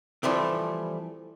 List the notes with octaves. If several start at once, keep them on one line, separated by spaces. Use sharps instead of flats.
E3 F3 G3 A3 C4